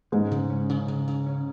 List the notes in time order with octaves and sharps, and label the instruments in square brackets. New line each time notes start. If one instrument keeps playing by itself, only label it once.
[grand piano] G#2 G#3 [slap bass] C#4
[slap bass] C#3
C#4
C#3
C#3
C#3
C#4